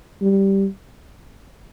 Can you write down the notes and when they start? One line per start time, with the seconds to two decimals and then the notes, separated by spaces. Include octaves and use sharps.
0.22 G3